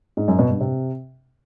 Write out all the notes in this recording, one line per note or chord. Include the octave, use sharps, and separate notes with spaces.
G#2
F#2
B2
G2
C3